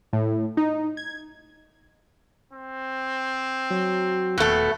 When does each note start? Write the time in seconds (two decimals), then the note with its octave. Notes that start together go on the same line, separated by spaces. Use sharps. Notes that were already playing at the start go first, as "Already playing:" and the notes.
0.13 A2
0.57 D#4
0.97 G#6
2.53 C4
3.70 F#3
4.38 D#1 B2 A3